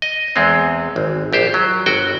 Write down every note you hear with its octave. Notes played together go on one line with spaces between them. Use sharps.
D#5
E2 G#3 C4
G#1
A#1 G4 C5
F#3
G1 F#4 G5